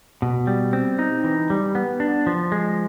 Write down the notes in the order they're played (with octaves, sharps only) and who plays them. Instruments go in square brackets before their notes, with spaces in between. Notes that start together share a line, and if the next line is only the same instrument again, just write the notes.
[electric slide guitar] B2
G3
C4
D#4
E3
G3
B3
D4
F3
G#3